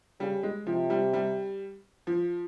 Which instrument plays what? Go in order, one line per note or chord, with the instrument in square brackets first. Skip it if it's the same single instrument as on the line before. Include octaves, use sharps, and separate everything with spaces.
[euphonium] C#3 [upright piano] G3
[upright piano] G#3
[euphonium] C3 [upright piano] F3
[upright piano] G3
G3
F3